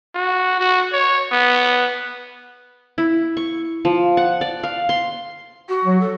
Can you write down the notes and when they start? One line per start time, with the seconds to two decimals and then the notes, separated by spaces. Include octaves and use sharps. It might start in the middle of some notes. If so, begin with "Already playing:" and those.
0.15 F#4
0.60 F#4
0.93 C#5
1.32 B3
2.98 E4
3.37 C#6
3.85 F3
4.17 F#5
4.41 D5
4.63 F5
4.89 C6
5.69 F#4
5.85 F#3
6.01 A4